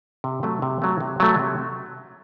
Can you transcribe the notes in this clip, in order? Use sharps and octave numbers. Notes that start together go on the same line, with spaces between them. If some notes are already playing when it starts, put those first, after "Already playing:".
C3
F#3 A3
C3
F#3 A3
C3
F#3 A3
C3